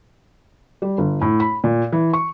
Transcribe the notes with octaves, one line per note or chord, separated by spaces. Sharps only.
G3
G1
A2
B5
A#2
E3
C#6